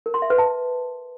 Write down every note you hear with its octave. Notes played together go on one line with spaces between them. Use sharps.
A#4
C6
E5
B4
A5